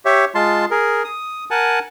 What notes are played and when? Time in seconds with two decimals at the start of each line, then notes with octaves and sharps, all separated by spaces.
0.05 G4 C#5 E5
0.35 G#3 F4 A5 C6
0.71 G#4 A#4
1.04 D#6
1.51 A#4 F#5 G#5 A5